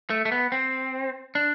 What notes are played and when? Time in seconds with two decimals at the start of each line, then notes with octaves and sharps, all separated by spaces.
0.10 A3
0.25 A3
0.32 B3
0.52 C4
1.35 D4